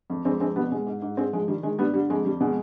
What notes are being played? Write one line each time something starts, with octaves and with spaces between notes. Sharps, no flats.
F2
F2 G#3 C4
F2 G#3 C4
B2 G3 B3
B2 G#3
G#2
G#2
G#2 G#3 C4
F3 G#3
D#3 G3
D#3 G#3
G2 G3 B3
D3 G3
F2 G#3
F2 G3
B2 G#3